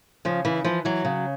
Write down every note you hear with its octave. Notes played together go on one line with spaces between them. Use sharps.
C#3 F3
C#3 E3
E3 F3
E3 F#3
C#3